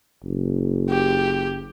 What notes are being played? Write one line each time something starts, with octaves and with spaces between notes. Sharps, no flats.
F#1
G4